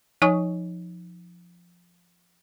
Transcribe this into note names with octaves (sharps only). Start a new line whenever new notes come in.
F3 D#4 C#5 G#5 C#6 D#6